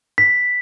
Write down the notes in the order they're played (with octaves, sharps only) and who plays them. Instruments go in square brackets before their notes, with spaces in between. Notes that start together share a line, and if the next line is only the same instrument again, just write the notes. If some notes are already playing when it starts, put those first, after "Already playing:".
[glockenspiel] B6